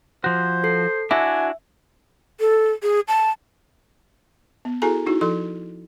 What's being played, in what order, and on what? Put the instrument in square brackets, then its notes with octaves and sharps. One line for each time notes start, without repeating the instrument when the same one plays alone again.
[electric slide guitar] F3 F#4 [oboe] C5
[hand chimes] A4 C7
[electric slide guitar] D4 E4 F#4 [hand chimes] E5 [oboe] G#5
[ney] A4
G#4
A5
[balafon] B3
E4 F#4 G#4 A4 G#5 A#5
D#4 E4 F#4
F3 A4 C6